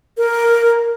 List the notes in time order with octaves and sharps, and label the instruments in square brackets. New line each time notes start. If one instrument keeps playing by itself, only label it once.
[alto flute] A#4